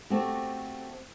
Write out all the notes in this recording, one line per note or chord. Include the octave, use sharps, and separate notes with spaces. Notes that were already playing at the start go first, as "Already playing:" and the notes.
A3 C4 F#4 G4